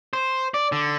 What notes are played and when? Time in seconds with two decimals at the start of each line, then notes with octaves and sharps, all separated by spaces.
0.13 C5
0.54 D5
0.72 D3